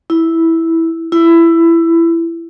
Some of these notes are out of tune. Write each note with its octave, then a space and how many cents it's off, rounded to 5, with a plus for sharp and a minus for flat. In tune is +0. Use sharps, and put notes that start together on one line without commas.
E4 -5
E4 +15